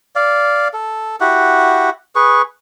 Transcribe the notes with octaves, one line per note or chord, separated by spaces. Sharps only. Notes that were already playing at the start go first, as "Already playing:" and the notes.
D5 F5
A4
E4 F#4 G4 F#5
G#4 B4 C#6